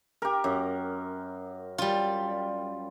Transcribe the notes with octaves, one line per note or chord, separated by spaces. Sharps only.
G4 A#4
F#2
G3 F4